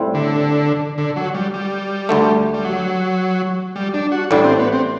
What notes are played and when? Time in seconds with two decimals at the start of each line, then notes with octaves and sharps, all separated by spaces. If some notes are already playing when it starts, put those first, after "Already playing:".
Already playing: A2 G3 C4 E4
0.14 D3
0.98 D3
1.16 F#3
1.34 G3
1.54 G3
2.09 D2 D3 A3
2.54 G3
2.64 F#3
3.76 G3
3.94 D4
4.12 F#4
4.31 A1 A2 G3 D4
4.44 C4
4.59 B3
4.72 C4